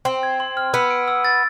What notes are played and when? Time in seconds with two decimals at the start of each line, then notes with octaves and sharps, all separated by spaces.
0.05 C4 C6
0.23 G#6
0.40 C6
0.57 F6
0.73 B3 E6
0.90 D7
1.08 E6
1.25 A6